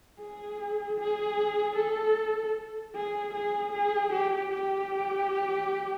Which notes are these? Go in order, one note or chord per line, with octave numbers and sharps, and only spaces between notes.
G#4
G#4
A4
G#4
G#4
G#4
G4
G4